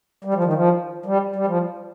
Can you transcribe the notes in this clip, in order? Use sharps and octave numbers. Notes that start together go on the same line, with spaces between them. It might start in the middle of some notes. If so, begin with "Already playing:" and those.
G3
F3
D#3
F3
G3
G3
F3